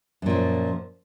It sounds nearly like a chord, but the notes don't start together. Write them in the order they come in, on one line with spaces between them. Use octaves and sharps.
F#2 A#2 F3